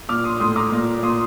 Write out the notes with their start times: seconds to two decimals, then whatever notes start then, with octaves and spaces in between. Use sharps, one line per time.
0.09 A#2 D6 F6
0.24 C6 D#6
0.40 A2 C6 D#6
0.56 A#5 D6
0.72 A#2
1.03 A#2 C6 D#6